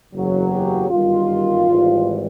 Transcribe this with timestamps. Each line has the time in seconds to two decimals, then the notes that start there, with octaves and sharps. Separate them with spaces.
0.13 F#1 E2 C#3 F#3
0.52 G4
0.90 G1 F#2 D#3 G3 F4
1.66 G#1 G#2 E3 G3